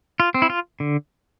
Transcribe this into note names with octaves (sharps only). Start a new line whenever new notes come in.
F4
C4
E4
F4
D3